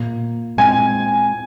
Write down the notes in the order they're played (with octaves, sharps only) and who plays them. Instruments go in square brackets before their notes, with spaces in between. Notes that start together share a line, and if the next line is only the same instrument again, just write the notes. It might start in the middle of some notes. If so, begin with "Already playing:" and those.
Already playing: [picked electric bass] A#2 A#3
[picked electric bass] A#2 G#3 C4 [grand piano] G#5